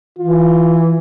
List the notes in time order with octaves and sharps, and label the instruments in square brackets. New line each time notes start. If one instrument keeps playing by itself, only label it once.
[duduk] E3 [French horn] F4